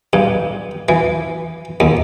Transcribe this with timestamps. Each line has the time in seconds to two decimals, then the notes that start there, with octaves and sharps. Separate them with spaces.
0.13 G2
0.89 E3
1.80 D#2